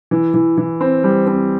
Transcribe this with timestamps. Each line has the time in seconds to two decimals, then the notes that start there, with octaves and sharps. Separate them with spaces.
0.11 E3
0.34 E3
0.57 E3
0.81 C4
1.04 G3
1.27 C4